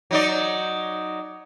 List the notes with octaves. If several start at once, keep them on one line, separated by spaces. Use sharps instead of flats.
F#3 D#4 D5